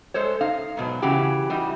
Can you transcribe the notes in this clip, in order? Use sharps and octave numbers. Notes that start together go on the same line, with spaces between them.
G#3 A4 C5 C#5
D#4 F5
G#2 B2 F#3
C#3 E3 F#4 G4
E3 G3 D#4 F#4